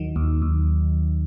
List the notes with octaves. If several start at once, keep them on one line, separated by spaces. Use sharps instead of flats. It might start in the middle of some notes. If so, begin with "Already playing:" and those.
Already playing: D#2 D#3 F#3
D#2
D#2